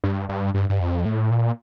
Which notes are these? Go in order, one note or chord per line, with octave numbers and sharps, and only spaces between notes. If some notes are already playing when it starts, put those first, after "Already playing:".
G2
G2
G2
G2
F2
A2
A#2